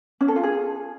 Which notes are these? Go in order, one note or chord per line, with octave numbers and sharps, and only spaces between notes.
C#4
A4
F4
G#4